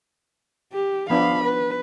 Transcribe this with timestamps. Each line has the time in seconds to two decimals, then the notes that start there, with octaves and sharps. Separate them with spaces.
0.73 G4
1.10 F3 B3 D4 F5 B5
1.44 B4